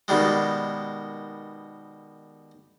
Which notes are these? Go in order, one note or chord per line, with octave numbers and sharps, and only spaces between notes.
B2 D#3 G3 G#3